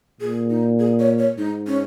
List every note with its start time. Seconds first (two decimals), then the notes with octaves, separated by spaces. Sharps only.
0.21 A#2 G#4
0.50 D#4
0.79 G#4
0.99 C#5
1.18 C#5
1.38 G#2 D#4
1.67 C#4